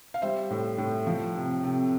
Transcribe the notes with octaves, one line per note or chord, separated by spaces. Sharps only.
F5
G3 C5 E5
A2
A2
F3
C3
C3